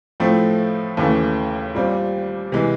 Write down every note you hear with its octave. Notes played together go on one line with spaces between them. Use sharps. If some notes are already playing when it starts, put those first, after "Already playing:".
A2 F3 A3 C4
D#2 C#3 E3 A3
A#2 G3 C4
C3 E3 G#3